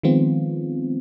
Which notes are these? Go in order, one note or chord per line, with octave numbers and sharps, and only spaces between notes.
D#3 F3 G#3 B3 C4 F4